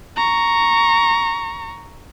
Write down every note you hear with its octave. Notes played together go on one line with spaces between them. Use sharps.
A#5 C#6